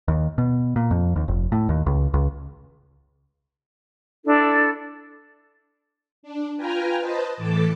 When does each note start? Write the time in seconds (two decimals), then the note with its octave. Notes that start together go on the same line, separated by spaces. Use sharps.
0.08 D#2
0.38 B2
0.76 A#2
0.91 F2
1.16 D#2
1.28 F1
1.52 A2
1.69 D#2
1.86 C#2
2.14 C#2
4.25 D4 E4 A4
6.23 D4
6.56 F4 B4 G5 G#5 A#5 F6
7.01 B4 C5 D#5 A5
7.37 A2 E3 A4 A5 D6 A6